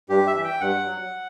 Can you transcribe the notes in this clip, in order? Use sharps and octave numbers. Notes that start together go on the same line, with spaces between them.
G2 G4
E5
E3
G5
G2 F#5
F#3